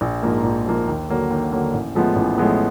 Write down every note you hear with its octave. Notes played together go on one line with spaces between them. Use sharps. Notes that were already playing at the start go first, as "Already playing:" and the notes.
A#1
G#2 F3 A#3
A#1
G#2 F3 A#3
D#2
D3 F#3 A#3
D#2
D3 F#3 A#3
A1
A2 F3 G#3 B3
A1
A2 F3 G#3 B3